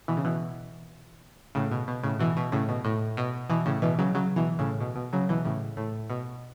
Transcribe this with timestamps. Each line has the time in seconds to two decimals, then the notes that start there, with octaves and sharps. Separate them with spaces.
0.08 B2 E3
0.17 C#3
0.25 B2 E3
1.55 A2 C#3
1.71 B2
1.88 B2
2.03 A2 C#3
2.19 B2 E3
2.37 B2
2.52 A2 C#3
2.69 B2
2.85 A2
3.17 B2
3.50 B2 E3
3.66 A2 C#3
3.82 B2 E3
3.99 C#3 F#3
4.15 C#3 F#3
4.36 B2 E3
4.59 A2 C#3
4.80 B2
4.96 B2
5.13 C#3 F#3
5.29 B2 E3
5.45 A2 C#3
5.77 A2
6.10 B2